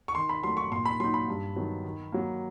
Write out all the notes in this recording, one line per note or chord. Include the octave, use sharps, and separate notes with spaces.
C#6
D#3 C6
B5
F#3 A3 C6
C#6
A#2 C6
B5
F#3 A#3 D#4 C6
B5
G2
D#3 F#3 B3
D#3
F#3 A#3